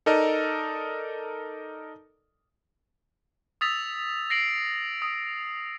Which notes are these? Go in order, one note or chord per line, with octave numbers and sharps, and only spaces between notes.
D#4 A4 A#4 D5 D#5
D#6 E6 A6 B6 F7
A#6 C7 D7 F#7
D#6